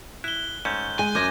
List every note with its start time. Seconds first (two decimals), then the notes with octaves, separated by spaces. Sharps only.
0.24 E4 F#6 G7
0.65 G#2 A3 C#4 G6
0.99 G#3 G#5
1.15 F#2 F3 D6 G#6 A#6